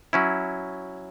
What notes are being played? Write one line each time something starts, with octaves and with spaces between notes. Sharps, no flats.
F#3 C#4 E4